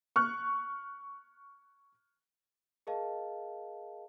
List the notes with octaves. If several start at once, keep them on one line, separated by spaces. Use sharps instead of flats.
C#6 F6 F#6
G#4 A#4 D#5 F5 A5